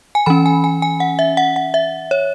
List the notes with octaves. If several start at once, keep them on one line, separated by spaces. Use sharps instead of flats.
G#5
E3 C#4 B5
G#5
G#5
G#5
F#5
E5
F#5
F#5
E5
C#5